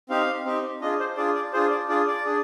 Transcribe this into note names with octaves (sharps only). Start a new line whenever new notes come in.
C4 D#4 G4 F5
C4 D#4 G4
D4 F4 G#4 D#5
C5
D4 F4 G#4 D5
D5
D4 F4 G#4 C5
D5
D4 F4 G#4 D5
D5
D4 G#4